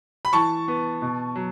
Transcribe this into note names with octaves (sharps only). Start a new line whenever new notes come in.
B5
E3 A5 C#6
B3
B2
F#3